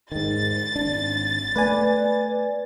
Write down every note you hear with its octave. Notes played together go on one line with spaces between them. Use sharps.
G#2 D#3 A6
G#1 D4
A3 B3 B4 D5 G#5